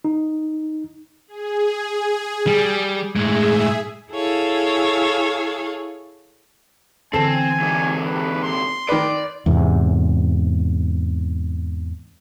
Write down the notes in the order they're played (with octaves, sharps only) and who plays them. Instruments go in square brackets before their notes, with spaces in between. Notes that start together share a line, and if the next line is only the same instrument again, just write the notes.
[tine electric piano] D#4
[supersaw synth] G#4
[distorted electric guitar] G3
[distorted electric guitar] A2 G#3 [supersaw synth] G#4 E5
[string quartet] E4 G#4 A4 C#5 F5
[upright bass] D3 E3 [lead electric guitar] C4 [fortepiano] A4 [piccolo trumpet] G#5
[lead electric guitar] G#2 C3
[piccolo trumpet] B4
C6
[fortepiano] D#3 B4 [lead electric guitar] D5
[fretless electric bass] E2 G#2 C3